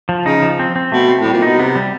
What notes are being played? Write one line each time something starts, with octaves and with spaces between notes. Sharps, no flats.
F3
C#3 D#4
F3
C4
C4
B2 A3
C4
A2 G3
A#2
B2 D#4
C3 B3
G3